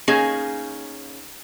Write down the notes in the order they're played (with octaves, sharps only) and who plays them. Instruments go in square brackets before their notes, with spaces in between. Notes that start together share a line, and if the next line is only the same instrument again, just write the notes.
[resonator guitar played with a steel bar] A#3 C#4 D#4 G#4